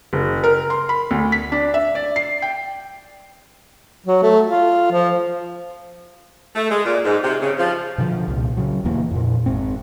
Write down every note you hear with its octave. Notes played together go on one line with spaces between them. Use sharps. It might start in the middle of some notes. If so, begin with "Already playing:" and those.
F#1
A#4
C6
B5
D2
B6
D4
E5
D5
C7
G5
F#3
A3
F4
F3
A3
G#3
A#2
G#2
C3
C#3
F3
B2 D3 E3 F3
C2 A#2
C#3 F#3
D#1 E2 E3 A#3
F2 A#2
G#1 G#2 C4